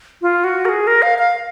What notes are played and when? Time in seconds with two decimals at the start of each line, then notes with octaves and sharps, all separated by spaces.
0.22 F4
0.44 F#4
0.65 A#4
0.69 G#4
0.87 A#4
1.02 F5
1.18 F5
1.35 F5